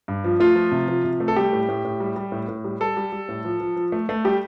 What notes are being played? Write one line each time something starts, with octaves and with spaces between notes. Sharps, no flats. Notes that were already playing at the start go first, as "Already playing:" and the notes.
G2
F3
A3 F4
F3
C3
F3
C3
A3
A4
G3 G4
A2
A2
A2
G3
G3
A2
A2
G3
G3 A4
G3
G3
A2
F3
F3
F3
A3
A3
G3 G4